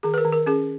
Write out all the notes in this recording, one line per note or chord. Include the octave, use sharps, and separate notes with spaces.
D#3 G#4
B4
A#4
D#3
A#4
C#4 G#4